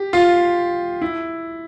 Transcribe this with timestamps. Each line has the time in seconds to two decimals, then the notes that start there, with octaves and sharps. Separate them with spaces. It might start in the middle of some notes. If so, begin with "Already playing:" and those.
Already playing: G4
0.13 F4
1.02 E4